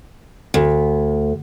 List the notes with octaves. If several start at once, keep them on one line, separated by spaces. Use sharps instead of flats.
D2